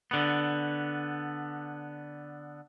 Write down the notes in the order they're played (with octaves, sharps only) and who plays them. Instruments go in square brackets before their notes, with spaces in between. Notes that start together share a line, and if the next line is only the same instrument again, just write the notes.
[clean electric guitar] D3 B3